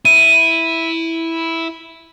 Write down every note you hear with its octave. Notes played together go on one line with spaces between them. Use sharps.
E4 D#7